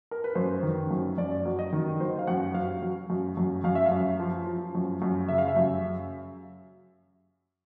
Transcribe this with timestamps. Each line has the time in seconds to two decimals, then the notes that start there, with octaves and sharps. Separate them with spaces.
0.11 A#4
0.24 B4
0.35 F#2 C5
0.63 D#3
0.91 F#2
1.18 F#2 D5
1.45 F#3
1.59 D#5
1.72 D#3
2.00 F#3 C5
2.19 F5
2.27 F#2 F#5
2.54 F#3 F5
2.82 F#3
3.10 F#2
3.37 F#2
3.64 F#2 F5
3.75 E5
3.86 F5
3.92 F#2
4.20 F3
4.46 F3
4.75 F#2
5.02 F#2
5.28 C#3 E5
5.38 F5
5.48 E5
5.56 F#2